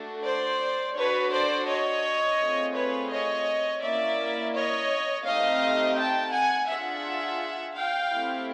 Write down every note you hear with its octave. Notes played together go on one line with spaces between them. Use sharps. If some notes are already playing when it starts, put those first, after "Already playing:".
Already playing: A3 D4 F#4 A4
C5 D5
D4 F#4 A4 B4 C#5
C5 D5
C#5 D#5
A3 C4 F4 G#4
B4 C#5
C#5 D#5
A#3 C#4 E4 D5 E5
C#5 D#5
A3 C4 D#4 G4 D#5 F5
G5 A5
F#5 G#5
D4 F4 G#4 E5 F#5
F5 G5
A3 C4 E4 G4